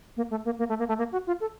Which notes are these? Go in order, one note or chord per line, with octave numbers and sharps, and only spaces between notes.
A#3
A3
A#3
A#3
A3
A#3
A3
A#3
F#4
F4
A4